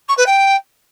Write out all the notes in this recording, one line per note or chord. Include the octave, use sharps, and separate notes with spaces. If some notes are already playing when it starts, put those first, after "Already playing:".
C#6
B4
G5